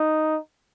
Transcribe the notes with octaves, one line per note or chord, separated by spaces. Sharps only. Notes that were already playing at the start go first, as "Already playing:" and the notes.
Already playing: D#4